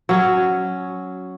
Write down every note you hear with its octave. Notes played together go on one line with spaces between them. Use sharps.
F#3 C#4